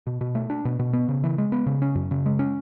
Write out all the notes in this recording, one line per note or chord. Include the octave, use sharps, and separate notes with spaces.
B2
B2
A3
D4
B2
B2
B3
C#3
E3
G#3
B3
C#3
C#4
F#2
C#3
G#3
C#4